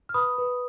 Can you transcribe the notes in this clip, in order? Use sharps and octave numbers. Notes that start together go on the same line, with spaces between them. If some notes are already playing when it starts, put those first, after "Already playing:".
F6
B4 B5 D#6
B4